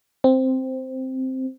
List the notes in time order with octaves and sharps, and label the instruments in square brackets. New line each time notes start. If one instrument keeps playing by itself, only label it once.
[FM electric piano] C4